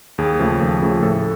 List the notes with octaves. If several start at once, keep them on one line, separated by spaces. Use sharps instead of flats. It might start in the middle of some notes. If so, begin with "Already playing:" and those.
D#2 G#4
C#3 F3 A3
D#2
C#3 F3 A3
A2 A4